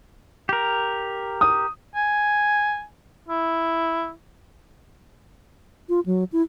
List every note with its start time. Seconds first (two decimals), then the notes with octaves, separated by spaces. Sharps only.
0.49 G4 A#4
1.41 D#6
1.95 G#5
3.28 E4
5.89 F4
6.06 F#3
6.32 E4